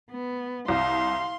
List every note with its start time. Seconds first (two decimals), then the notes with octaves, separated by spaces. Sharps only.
0.11 B3
0.68 C2 F5 C6